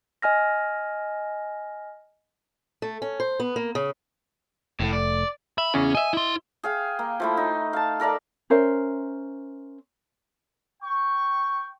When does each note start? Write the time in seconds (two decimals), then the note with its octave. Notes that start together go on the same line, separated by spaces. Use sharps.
0.22 D#5 G#5 F6 A#6
2.82 A3
3.02 C#4
3.20 C5
3.40 B3
3.56 A#3
3.75 C#3
4.80 F1 A2 A3
4.93 D5
5.58 E5 B5
5.74 E2 C#3 C#4
5.95 D#5 E5 G#5
6.13 E4 C6
6.64 G#4 F5 G5
6.99 A#3
7.20 F3 A3 E4
7.37 D#4
7.73 F5 A5
8.00 A4 A#4 D5 E5
8.50 C#4 A#4 C5 E5
10.83 G5 C#6